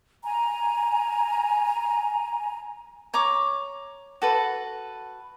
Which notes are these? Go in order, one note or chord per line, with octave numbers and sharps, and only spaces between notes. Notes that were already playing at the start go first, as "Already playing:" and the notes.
G#5 A#5
C#5 A#5 C#6 D6
F#4 A4 B4